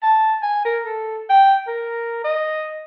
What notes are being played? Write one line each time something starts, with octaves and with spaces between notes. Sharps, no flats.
A5
G#5
A#4
A4
G5
A#4
D#5